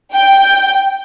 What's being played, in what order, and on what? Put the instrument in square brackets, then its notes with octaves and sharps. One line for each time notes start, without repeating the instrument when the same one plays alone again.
[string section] G5